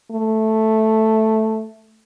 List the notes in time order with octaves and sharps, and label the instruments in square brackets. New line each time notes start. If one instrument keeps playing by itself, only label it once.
[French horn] A3